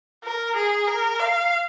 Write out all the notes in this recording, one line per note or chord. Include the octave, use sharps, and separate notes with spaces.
A#4
G#4
A#4
F5